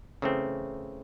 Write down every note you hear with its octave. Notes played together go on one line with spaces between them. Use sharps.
C#3 E3 A3 C4